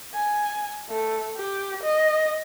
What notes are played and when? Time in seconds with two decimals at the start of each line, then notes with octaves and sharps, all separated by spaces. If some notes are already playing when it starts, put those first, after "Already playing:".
0.14 G#5
0.89 A3
1.37 G4
1.83 D#5